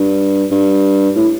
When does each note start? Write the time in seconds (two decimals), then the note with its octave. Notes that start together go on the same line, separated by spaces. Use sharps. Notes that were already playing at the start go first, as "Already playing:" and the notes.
Already playing: G2
0.51 G2
1.16 A2